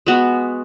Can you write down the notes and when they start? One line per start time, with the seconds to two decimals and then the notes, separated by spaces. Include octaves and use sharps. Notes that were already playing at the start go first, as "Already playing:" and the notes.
0.06 G#3 B3 F#4